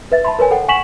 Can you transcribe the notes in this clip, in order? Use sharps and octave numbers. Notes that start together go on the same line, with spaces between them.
B4 E5 A6
A5 B5 C6
A#4 B4 C#5 G#5
A4 F#5 G5
F#5 G#5 C#6 B6 E7 F#7